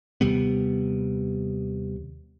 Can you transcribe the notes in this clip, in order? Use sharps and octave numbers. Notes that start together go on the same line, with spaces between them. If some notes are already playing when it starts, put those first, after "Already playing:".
D#2 C3 G3 B3